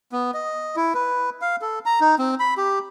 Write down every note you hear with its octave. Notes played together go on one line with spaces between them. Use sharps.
B3
D#5
E4
B4
F5
A4
A#5
D#4
C4
B5
G4